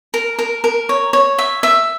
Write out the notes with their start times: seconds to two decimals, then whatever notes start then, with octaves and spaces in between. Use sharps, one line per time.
0.14 A#4
0.39 A#4
0.64 A#4
0.89 C#5
1.13 C#5
1.38 E5
1.63 E5